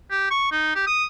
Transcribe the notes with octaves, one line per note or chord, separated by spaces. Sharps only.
G4
C#6
D#4
G4
D#6